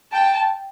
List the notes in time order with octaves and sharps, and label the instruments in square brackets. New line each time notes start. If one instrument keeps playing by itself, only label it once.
[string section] G5 [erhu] A5